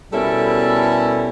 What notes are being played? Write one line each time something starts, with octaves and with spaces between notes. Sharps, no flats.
B2 G3 C#4 E4 A4 A#4